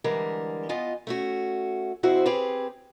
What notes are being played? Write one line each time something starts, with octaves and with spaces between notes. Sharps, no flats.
D3 E3 G3 G#3 A#4
B3 F4 D#5 G#5
A3 C#4 F#4
F2 C4 E4 F#4 C5
C4 G4 G#4 B4